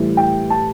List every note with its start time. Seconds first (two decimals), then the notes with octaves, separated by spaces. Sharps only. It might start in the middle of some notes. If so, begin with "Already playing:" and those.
Already playing: A2 E3 G3
0.17 G5
0.50 A5